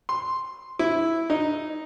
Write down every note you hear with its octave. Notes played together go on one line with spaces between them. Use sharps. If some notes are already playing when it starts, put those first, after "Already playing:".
C6
E4
D#4